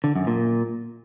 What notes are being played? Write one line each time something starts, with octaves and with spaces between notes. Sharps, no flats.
D3
F#2
A#2